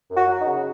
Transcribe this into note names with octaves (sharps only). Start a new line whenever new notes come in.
F#2
F#4
F#3
D#4
C#3